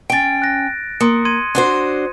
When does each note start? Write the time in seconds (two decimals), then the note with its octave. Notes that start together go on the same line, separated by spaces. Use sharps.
0.10 C#4 G5 A6 D7
0.42 F#6 A#6
1.01 A#3 C6 D#6 C#7
1.25 C6 G#6 D#7
1.55 D4 F#4 C5